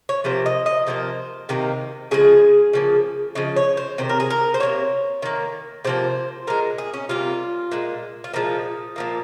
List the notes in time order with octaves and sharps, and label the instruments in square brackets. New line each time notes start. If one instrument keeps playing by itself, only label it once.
[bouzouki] C#5
C3 F3 A#3 C5
D#5
D#5
C3 F3 A#3 C5
C3 D#3 A#3
C#3 F3 G#3 G#4
C#3 F3 A#3
C#3 F3 D#5
C#5
C5
C3 D#3 C5
A#4
G#4
A#4
C5
C3 F3 A#3 C#5
D#3 A#3
C3 F3 A#3 C5
A#2 G#3 A#4
G#4
C#4
C3 G3 A#3 F4
A#2 G#3
F4
A#2 F3 G#3 D#4
A#2 F3 A#3